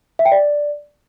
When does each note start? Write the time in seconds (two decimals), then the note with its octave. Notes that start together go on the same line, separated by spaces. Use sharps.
0.19 E5
0.25 G5
0.32 D5